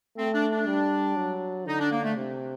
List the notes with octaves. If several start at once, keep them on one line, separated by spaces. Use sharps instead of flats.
A3 C4
D4
D4
G3
F#3
D3 D#4
D4
A#3
A3
C3